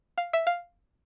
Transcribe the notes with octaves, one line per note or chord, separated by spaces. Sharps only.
F5
E5
F5